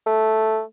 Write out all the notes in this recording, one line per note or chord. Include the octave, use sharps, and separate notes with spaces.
A3